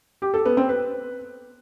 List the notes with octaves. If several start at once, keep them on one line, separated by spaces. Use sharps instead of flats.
G4
A4
B3
C4
B4